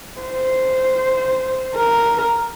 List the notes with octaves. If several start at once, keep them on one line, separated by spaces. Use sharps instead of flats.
C5
A#4